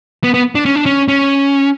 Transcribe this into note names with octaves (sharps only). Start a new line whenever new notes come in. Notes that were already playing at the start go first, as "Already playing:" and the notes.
B3
B3
D4
C#4
D4
C#4
C#4